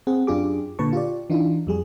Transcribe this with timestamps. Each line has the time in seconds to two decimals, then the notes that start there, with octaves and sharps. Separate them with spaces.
0.07 C4 G#4 F#5
0.27 F#2 D4 F4 G4 G#4 D6
0.79 A#2 D3 B4 A5 C#6
0.93 F4 G4 D5
1.30 E3 D4 D#4 F4
1.67 F2 G3 G#4